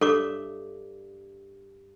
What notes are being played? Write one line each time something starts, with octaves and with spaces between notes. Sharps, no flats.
G2 A4 C#5 E5 D6